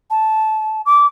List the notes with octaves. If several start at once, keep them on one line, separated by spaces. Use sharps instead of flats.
A5
D6